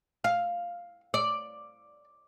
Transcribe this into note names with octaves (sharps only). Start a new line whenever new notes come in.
F5
D5